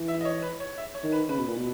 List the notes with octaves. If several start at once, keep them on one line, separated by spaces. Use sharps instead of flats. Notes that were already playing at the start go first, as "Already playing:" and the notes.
Already playing: E3
E5
D#5
C#5
B4
C#5
E5
C#5
D#3
B4
C#3 B4
B2
A#2
B2